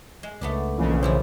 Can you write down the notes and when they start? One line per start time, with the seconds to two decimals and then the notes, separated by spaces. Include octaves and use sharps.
0.23 G#3
0.41 C#2 A3 B3 D4
0.78 B1 C#3 E3 F3 A#3
1.03 A#2 E3 F3 E4 C5